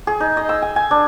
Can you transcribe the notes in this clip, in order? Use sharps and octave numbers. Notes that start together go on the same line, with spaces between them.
G#4
D#4
D#5
E6
G#5
G#5
D4